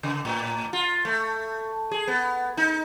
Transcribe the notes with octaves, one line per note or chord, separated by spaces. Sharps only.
C#3
A2
F4
A3
G#4
B3
D#4